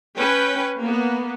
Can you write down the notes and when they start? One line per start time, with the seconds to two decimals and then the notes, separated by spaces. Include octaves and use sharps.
0.16 C#4 B4 G5
0.80 A#3 B3